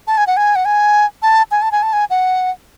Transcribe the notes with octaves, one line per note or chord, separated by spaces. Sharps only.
A5
G#5
F#5
G#5
F#5
G#5
A5
G#5
A5
G#5
A5
G#5
F#5